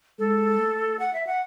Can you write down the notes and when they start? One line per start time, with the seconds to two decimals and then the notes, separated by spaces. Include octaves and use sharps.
0.19 G#3 A4
0.59 A3
0.99 F#5
1.13 E5
1.27 F#5